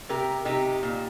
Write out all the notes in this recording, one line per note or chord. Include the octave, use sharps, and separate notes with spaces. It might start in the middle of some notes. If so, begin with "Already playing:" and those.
C3 G4 A#4
C3 D#4 G4
A#2